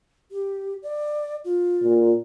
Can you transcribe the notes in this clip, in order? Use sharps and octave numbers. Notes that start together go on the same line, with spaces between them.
G4
D5
F4
A#2